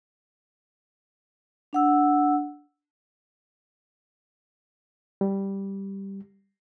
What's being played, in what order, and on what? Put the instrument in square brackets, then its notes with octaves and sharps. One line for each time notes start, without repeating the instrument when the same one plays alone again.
[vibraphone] D4 F#5 E6
[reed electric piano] G3